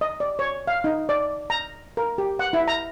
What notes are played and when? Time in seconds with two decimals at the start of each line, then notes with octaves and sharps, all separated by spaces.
0.01 D#5
0.20 D5
0.39 C#5
0.67 F5
0.84 D#4
1.09 D5
1.50 A#5
1.97 A#4
2.18 G4
2.39 F#5
2.53 E4
2.68 A#5